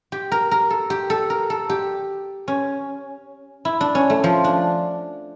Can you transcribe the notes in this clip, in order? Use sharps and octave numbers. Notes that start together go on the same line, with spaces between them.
G4
A#4
A#4
A4
G4
A4
A#4
A4
G4
C#4
E4
D4
C#4
A3
F3
D4